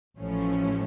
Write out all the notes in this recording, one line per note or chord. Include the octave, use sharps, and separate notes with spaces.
A1 A2 F3 A3 C#4